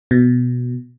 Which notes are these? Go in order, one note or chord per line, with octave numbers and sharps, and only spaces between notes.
B2